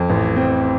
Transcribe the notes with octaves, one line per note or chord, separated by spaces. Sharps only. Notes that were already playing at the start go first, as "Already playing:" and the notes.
Already playing: F2
A1
C4